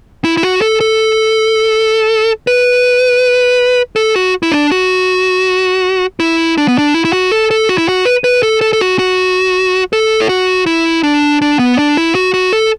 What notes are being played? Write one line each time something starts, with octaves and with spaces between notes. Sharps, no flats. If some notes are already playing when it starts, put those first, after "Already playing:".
E4
E4
F#4
A4
A4
B4
A4
F#4
E4
D4
F#4
E4
D4
B3
D4
E4
E4
F#4
A4
A4
F#4
E4
F#4
B4
B4
A4
A4
A4
F#4
F#4
A4
E4
F#4
E4
D4
D4
B3
D4
E4
F#4
F#4
A4